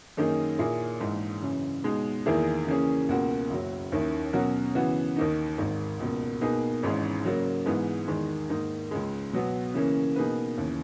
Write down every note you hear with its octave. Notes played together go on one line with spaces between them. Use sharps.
F#2 D#3 A#3 D#4 G#4
A#2 A#3 E4 G#4
A#1 G#2 E3 G#3
F#2 C#3 E3
B2 G#3 D#4
E2 D#3 A#3 E4 G#4
C#3 E3 A#3 C#4 G#4
C#2 B2 A#3 C#4 F#4
F#1 F#2 C#3 F#3
D#2 D#3 A#3 C#4 E4
B2 F#3 C#4 F#4 A#4
C#3 E3 B3 F#4
D#2 D#3 A#3 D#4
G#1 G#2 D#3
C#2 B2 A#3
B2 A#3 D#4 G#4 B4
G#1 G#2 E3 G#3 C#4
C#3 F#3 A#3
G#2 E3 G#3 B3
E2 D#3 G#3
G#2 D#3 A#3 D#4
C#2 C#3 G#3
B2 F#3 B3
C#3 E3 A#3 C#4
B2 A#3 D#4 G#4 B4
D#2 C#3 E3